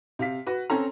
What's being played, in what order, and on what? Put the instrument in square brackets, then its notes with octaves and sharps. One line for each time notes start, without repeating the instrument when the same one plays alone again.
[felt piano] C3 F5 B6
F#4 B4
C4 C#4 A4 A#5